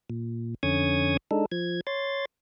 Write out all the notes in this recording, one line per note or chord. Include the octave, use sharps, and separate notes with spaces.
A#2
F2 D3 C#4 C#6 D#6 G#6
G#3 D4 D#4 A4
F3 G#6
C#5 C6 A6